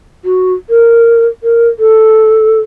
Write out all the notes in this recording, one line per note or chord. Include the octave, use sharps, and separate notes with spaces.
F#4
A#4
A#4
A4